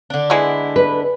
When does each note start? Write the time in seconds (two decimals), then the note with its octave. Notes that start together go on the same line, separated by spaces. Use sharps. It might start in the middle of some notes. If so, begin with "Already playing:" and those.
0.10 D3 D4
0.30 G#3 B3 E4
0.76 B4